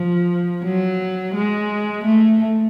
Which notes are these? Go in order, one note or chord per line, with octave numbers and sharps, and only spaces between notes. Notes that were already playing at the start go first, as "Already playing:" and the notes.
Already playing: F3
F#3
G#3
A3